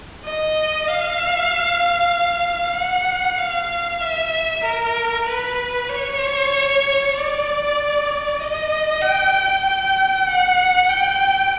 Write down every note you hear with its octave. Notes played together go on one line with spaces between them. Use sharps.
D#5
F5
F#5
F5
E5
A#4
B4
C#5
D5
D#5
G5
G5
F#5
G5